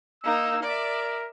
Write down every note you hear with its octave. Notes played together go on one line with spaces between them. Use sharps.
A#3 D#4 E6
A#4 D5 E5